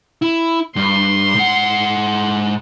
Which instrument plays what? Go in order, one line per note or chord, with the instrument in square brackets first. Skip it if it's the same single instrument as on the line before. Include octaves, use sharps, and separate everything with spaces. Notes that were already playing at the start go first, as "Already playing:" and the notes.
[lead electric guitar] E4
[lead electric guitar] G2 [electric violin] C6
[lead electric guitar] G#2 F#5